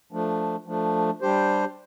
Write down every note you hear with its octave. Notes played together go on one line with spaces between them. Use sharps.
F3 A3 D4
F3 A3 D4
G3 D4 G4 C5